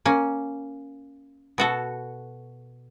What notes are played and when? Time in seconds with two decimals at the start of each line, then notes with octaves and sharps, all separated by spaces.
0.05 A#3 C#4
1.58 B2 F#4 A4